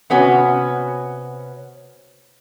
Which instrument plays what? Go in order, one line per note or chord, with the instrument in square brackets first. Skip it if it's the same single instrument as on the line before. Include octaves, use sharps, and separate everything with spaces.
[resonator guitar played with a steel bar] C3 B3 C#4 F#4